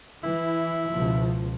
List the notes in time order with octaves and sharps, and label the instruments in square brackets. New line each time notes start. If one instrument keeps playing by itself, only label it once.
[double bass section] E3 [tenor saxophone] E4
[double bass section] C#2 B2 F3